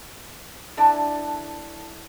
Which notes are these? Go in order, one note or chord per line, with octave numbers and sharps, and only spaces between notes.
A3 D4 E4 D5 A5